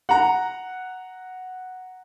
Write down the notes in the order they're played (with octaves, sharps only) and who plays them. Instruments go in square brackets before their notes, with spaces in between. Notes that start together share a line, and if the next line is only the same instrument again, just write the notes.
[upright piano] F#5 A#5